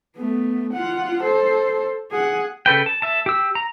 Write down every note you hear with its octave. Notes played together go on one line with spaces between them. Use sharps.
A3 B3
F4 F#5
A4 C5
G#4 F#5
C#3 A4 B4 G5
A5
E5 A5
G4 E6
A#5